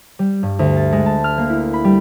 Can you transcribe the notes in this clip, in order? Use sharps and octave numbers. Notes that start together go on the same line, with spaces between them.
G3
G2
D2
A6
G#3
A5
F6
A#3
E4
B5
G3